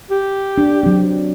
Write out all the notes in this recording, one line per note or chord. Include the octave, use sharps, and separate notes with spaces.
G4
D4
F#3 C4